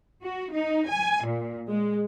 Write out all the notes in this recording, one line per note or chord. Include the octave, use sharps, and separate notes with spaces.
F#4
D#4
G#5
A#2
G#3